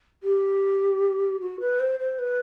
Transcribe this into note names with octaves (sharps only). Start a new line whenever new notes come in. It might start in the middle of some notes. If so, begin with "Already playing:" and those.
G4
F#4
B4
C5
C5
B4